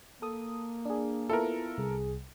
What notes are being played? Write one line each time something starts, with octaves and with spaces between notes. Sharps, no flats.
A#3 A4 D#6
D4 G#4
B3 E4 F4 A4 A#4
C2 G#4